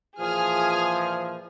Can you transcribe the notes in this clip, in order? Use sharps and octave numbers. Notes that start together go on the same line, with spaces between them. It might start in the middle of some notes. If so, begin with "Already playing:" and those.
A#2 E3 F3 G#4 G#5 F6